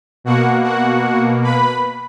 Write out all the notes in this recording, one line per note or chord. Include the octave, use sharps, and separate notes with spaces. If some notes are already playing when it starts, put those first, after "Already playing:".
B2 A#3 F#4 F#5
F#4 F#5
B4 B5